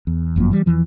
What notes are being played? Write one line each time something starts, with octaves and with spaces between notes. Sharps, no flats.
E2
G1 F#2 F3 A#3
E3 G3
E2 E3 F3